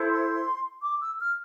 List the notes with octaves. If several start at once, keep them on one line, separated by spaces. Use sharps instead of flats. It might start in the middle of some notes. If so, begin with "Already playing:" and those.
Already playing: E4 A4 C5
C6
D6
E6
F6